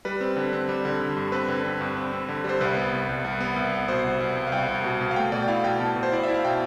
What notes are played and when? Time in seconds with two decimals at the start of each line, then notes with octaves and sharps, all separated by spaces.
0.05 G3 B4
0.21 C4
0.36 D3
0.53 C4
0.69 G3
0.85 D3
1.01 D3
1.16 G2
1.32 C4 B4
1.48 D3
1.65 C4
1.81 G2
1.96 C4
2.13 C4
2.28 D3
2.44 G3 C5
2.61 C2 B4
2.77 B3
2.93 C2
3.09 C2
3.24 C2
3.40 B3
3.56 C2
3.72 B3
3.88 B2 C5
4.04 C2
4.20 C2
4.37 C2
4.47 F5
4.52 C2 G5
4.68 C2
4.84 B2
5.01 B2
5.11 F5
5.16 A3 G5
5.32 B2 D5
5.42 G5
5.48 E4 F5
5.64 B2 G5
5.80 B2 A5
5.96 B2
6.03 C5
6.12 E4 D5
6.23 E5
6.28 E4
6.34 F5
6.45 B2 G5